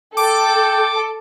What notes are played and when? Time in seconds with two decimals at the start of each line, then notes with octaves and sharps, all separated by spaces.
0.17 A4 G5 D6